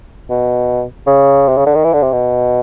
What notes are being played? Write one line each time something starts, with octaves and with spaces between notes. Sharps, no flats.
B2
C#3
C3
C#3
D3
D#3
E3
D3
C3
B2